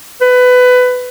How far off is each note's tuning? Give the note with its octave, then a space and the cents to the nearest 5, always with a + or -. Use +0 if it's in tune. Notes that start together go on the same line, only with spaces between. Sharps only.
B4 +20